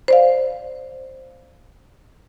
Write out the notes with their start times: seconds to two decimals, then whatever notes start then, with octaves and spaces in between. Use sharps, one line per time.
0.08 C5 D5 F5